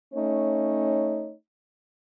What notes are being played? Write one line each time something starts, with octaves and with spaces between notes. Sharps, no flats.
A3 C#4 D#4 C#5